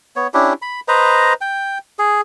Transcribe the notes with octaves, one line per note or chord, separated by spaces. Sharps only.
B3 C#5
C#4 D4 E4 G4
B5
B4 C5 D#5 A#5
G5
G#4